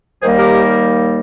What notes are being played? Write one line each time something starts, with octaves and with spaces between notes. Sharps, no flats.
D#2 D#3 G3 A#3 G#4 C5
G4 A#4